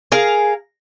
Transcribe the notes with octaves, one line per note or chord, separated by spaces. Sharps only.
G#4 A#4 F5